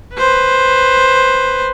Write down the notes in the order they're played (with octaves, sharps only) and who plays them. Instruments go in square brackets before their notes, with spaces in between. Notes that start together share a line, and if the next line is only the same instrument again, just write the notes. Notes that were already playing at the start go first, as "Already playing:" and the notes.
[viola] B4 C5